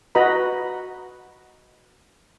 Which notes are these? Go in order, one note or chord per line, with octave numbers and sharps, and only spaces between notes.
F#4 B4 D#5 A#5 B5